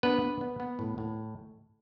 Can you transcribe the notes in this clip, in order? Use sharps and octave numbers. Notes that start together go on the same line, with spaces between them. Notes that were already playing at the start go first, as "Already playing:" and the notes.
B3 D4 B4
B3
B3
B3
A2
A2